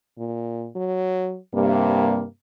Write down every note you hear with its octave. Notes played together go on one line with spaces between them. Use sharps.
A#2
F#3
G2 C3 A#3